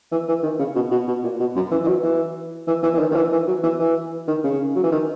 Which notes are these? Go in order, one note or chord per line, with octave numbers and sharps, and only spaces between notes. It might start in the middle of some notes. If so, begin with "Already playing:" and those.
E3
E3
D#3
C#3
B2
B2
B2
A#2
B2
F#2
E3
E3
F#3
E3
E3
E3
E3
D#3
D#3
E3
E3
F#3
E3
E3
D#3
C#3
F#3
E3
D#3